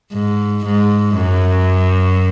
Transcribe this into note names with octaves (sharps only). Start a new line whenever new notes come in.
G#2
G#2
F#2